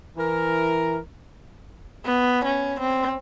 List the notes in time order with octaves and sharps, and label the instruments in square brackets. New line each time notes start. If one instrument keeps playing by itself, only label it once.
[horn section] E3 A#4
[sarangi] B3
C#4
C4